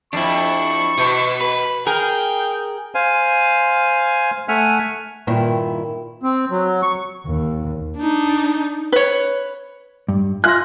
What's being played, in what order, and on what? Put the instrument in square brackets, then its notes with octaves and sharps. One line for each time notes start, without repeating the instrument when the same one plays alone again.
[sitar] F2 [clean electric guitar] D4 E4 [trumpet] C#6
[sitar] B2
[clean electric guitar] B4
[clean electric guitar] G#4 [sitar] A#4 [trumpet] G5
[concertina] C5 F5 G#5
A3 E5 F#5 G#5 F6
[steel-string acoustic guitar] G2 A#2 D#3 E4
[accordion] C4
F#3
C#6
[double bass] D#2
[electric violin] D4 D#4
[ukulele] B4 C#5
[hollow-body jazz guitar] G2
[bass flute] F4 [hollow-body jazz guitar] E5 F5 G#5 [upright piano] F#6 A#6